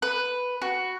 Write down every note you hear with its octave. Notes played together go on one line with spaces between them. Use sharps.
B4
F#4